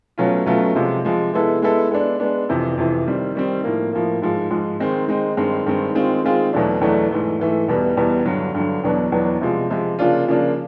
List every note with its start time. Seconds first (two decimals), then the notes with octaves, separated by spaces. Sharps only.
0.18 B2 F#3 A3 C#4 F4
0.46 B2 F#3 A3 C#4 F4
0.76 C3 F3 G#3
1.05 C3 F3 G#3
1.34 G#3 B3 E4 A4
1.62 G#3 B3 E4 A4
1.91 G#3 B3 D4
2.20 G#3 B3 D4
2.49 F2 C3 E3
2.78 F2 C3 E3
3.06 D#3 G3 C4
3.35 D#3 G3 C4
3.64 A2 F3 A#3
3.93 A2 F3 A#3
4.22 G#2 F3 G#3
4.50 G#2 F3 G#3
4.80 D#3 G#3 C4 D#4
5.08 D#3 G#3 C4 D#4
5.37 G2 D#3 G#3 C4
5.66 G2 D#3 G#3 C4
5.95 D#3 G#3 C4 F4 G#4
6.24 D#3 G#3 C4 F4 G#4
6.53 E2 B2 F#3 A3 D4
6.81 E2 B2 F#3 A3 D4
7.11 G#2 E3 A3
7.39 G#2 E3 A3
7.68 E2 B2 G3 B3
7.97 E2 B2 G3 B3
8.25 G2 D3 F#3
8.54 G2 D3 F#3
8.84 E2 B2 F#3 B3 D4
9.12 E2 B2 F#3 B3 D4
9.41 C3 F3 G#3
9.70 C3 F3 G#3
9.99 C#3 F3 A#3 D4 F4
10.28 C#3 F3 A#3 D4 F4